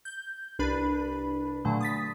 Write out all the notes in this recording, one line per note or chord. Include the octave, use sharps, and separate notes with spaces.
G6
C2 D4 B4 B5
A#2 D3 F#3 A3
D#6 A6 B6